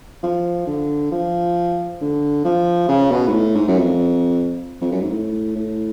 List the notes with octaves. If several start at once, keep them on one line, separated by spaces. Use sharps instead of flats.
F3
D3
F3
D3
F3
C#3
B2
G#2
A2
G#2
F#2
F2
F2
F#2
G#2
A2
A2